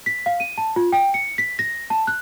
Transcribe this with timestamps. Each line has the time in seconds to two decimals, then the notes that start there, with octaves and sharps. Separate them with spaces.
0.06 B6
0.26 F5
0.40 D#7
0.58 A5
0.76 F4
0.93 G5
1.14 C#7
1.38 B6
1.59 A#6
1.90 A5
2.07 F#6